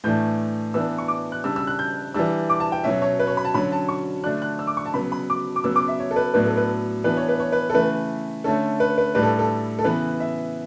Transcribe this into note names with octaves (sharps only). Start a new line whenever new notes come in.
A2 E3 A3 D4 G6
E3 B3 D4 E6
C#6
D6
F#6
C#3 G3 D4 E6
E6
F#6
G6
E3 G3 D4 E6
D6
A5
G5
B2 F#3 C#4 E5
C#5
B4
C#5
B5
A5
D3 F#3 C#4 B5
A5
C#6
D3 A3 D4 F#6
F#6
E6
D6
C#6
A5
C#3 F#3 B3 B5
B5
D6
D6
C#3 F#3 B3 E6
D6
E5
C#5
A4
B4
A2 F#3 B3 D4 B4
A4
B4
E3 B3 D4 B4
C#5
B4
C#5
B4
A4
C#3 E3 A3 B4
D3 A3 C#4 A4
B4
B4
A2 G3 D4 B4
A4
A4
A4
C#3 E3 B3 B4
E5